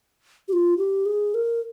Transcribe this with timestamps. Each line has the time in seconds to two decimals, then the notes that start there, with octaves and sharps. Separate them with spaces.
0.48 G4
0.53 F4
0.78 G4
1.06 G#4
1.34 A#4